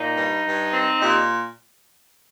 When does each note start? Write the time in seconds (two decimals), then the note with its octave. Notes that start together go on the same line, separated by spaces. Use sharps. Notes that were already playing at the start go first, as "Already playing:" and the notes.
Already playing: A#2 D#4
0.17 G2
0.46 G2
0.73 C4
1.00 A#2 D#4 G4